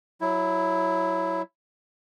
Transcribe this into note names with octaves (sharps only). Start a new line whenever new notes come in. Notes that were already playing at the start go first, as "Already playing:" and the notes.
F#3 E4